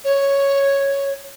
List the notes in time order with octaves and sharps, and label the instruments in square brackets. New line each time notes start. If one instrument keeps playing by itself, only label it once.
[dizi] C#5